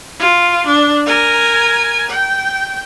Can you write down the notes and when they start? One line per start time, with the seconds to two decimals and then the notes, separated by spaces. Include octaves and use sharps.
0.20 F4
0.67 D4
1.06 A#4 G#5
2.10 G5